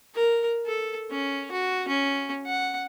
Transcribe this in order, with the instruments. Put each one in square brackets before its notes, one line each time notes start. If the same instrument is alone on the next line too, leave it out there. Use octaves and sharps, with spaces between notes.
[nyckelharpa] A#4
A4
C#4
F#4
C#4
F#5